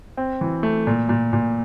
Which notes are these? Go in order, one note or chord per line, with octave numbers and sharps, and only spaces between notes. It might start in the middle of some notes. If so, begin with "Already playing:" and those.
C4
E3
A3
A#2
A#2
A#2